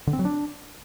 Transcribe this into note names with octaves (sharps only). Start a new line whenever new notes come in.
D3
C4
F#3
D4